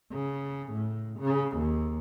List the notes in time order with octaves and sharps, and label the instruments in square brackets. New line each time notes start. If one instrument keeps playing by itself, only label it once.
[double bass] C#3
A2
C#3
D#2